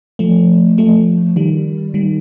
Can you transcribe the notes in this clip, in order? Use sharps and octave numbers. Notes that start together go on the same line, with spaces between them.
F3 A3
F3 A3
D#3 G3
D#3 G3